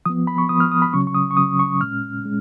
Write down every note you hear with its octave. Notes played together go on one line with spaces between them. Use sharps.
F3 B3 D#6
B5
C#6
F3 B3 D#6
F6
D#6
B5
C#3 F#3 C#4 C#6
C#6
D#6
C#6
C#3 F#3 C#4 D#6
C#6
A#2 G#3 C#4 F6
G#3 C#4